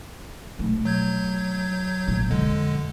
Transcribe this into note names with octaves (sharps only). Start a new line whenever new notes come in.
B2 A3
F#3 G6 G#6
B1 A#2
F2 D3 G#3